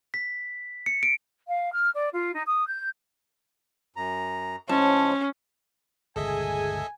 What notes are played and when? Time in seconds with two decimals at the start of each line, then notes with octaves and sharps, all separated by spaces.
0.14 B6
0.86 C#7
1.03 D7
1.48 F5
1.72 F6
1.94 D5
2.14 F4
2.35 D#4
2.47 D#6
2.68 G6
3.96 F#2 A#5
4.69 A2 F3 G#3 C#4 A5
6.16 G1 C#2 A#2 G#4 A4 D#5 E5 G#5